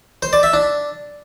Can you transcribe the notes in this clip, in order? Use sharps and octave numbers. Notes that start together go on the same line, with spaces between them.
C5
D5
E5
D4